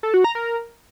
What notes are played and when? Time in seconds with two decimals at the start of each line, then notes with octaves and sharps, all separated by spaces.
0.03 A4
0.14 F#4
0.24 A#5
0.35 A#4